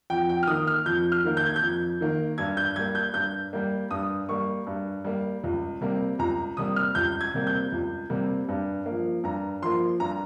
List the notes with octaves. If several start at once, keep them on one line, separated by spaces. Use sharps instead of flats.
F2 G5
G5
F6
D#3 A#3 D#6
F6
F2 G6
F6
D#3 A#3
G6
G#6
G6
F2
D#3 A#3
G2 G#6
G6
G3 A#3 G#6
G6
G2 G6
G3 A#3
G2 D#6
G3 A#3 C#6
G2
G3 A#3
C#2
C3 G3 A#3
C#2 A#5
C3 G3 A#3 D#6
F6
C#2 G6
G#6
C3 G3 A#3
G6
C#2
C3 G3 A#3
G2
F3 A#3
G2 A#5
F3 A#3 C6
G2 A#5